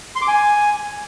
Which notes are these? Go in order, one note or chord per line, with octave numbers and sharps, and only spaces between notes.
C6
D6
G#5